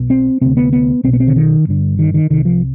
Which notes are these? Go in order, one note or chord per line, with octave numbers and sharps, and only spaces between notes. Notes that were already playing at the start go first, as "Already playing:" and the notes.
Already playing: B1 B2
C4
D2 C3 C4
B3
B3
B1 B2 C4
B3
C4
D3
D#3
G1 G2 D3
D#3
D#3
C2 C3 D#3
F3